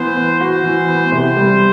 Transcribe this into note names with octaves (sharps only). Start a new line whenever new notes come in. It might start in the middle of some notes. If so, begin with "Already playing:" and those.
Already playing: E3 B3 C5
B4
F#4 C5
E3
B3
C3 C5
G3